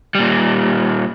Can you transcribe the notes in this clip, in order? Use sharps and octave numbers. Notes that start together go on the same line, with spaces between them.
A#2 G3